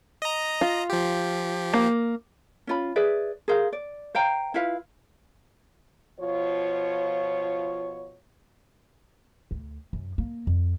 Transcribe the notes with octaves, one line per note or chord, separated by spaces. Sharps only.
D#5 A#5
F4
F3 G4
A#3
C#4 F4 B5
G#4 B4 D5 E5
G#4 A#4 C5 F5
D5
C5 F5 G5 A#5
E4 F4 B4 F5
B2 F3 F4 C#5
D2
F#2
A#3
F2